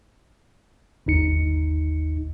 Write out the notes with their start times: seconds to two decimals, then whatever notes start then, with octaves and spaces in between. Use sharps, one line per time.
1.06 G1 D#2 D#4 C#7